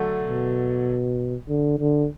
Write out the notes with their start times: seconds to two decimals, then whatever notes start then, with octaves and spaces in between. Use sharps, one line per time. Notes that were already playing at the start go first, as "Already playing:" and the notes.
Already playing: D3 F#3 A3
0.22 B2
1.48 D3
1.79 D3